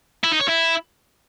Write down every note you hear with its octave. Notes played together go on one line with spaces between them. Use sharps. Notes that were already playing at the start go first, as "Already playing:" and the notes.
E4
D#4
C#5
E4